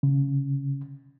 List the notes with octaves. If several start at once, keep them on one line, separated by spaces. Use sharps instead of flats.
C#3